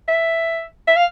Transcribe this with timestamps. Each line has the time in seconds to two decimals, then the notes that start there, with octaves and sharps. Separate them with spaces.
0.08 E5
0.88 E5
0.96 F5